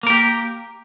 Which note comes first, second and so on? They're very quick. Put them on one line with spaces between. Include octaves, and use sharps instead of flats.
A#3 A#4 G4